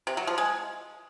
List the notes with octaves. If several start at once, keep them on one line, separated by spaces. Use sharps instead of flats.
C3
F#3
F3
G#3